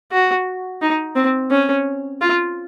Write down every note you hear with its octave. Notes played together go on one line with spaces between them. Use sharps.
F#4
D#4
C4
C#4
F4